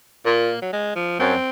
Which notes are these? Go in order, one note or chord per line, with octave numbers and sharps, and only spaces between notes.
A#2 A#3
F#3
G#3
F3
F#2 C4